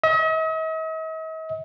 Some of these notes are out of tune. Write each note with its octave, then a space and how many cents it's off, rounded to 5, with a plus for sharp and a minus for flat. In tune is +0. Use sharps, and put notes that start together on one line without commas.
D#5 +45